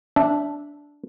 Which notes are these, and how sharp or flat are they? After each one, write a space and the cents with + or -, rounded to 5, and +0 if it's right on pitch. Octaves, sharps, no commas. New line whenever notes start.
D4 -10 E5 +0